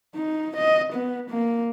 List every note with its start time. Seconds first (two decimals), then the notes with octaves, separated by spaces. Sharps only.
0.15 D#4
0.57 D#5
0.93 B3
1.30 A#3